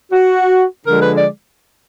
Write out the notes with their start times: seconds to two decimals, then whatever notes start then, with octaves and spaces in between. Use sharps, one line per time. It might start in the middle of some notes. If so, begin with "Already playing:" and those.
0.11 F#4
0.86 D3 F3 G#3 A#4
1.00 B4
1.14 D5